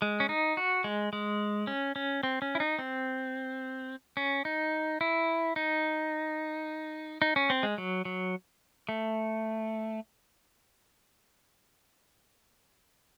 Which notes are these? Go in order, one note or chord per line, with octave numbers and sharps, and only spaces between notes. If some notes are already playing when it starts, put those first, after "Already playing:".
G#3
C#4
D#4
F#4
G#3
G#3
C#4
C#4
C4
C#4
E4
D#4
C4
C#4
D#4
E4
D#4
D#4
C#4
C4
G#3
F#3
F#3
A3